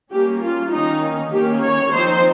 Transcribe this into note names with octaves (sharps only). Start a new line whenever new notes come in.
G3 A#3 C#4 G4
F4
D#3 A#3 C#4 D#4
D#3 A#3 C#4 G4
C#5
F3 C4 D#4 C5